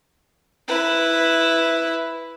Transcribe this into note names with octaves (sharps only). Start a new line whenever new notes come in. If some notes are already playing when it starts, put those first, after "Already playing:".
E4 B4